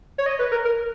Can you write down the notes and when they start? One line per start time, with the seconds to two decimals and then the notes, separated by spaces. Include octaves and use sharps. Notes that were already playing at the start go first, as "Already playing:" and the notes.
0.18 C#5
0.26 D#5
0.39 B4
0.52 A#4
0.65 A#4